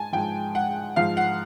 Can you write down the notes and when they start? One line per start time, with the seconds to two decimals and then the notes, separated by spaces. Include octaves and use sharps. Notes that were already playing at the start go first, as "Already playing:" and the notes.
Already playing: G#2 G#5 A5
0.13 G#2 F3 G5
0.55 F#5
0.96 G#2 F3 F5
1.17 F#5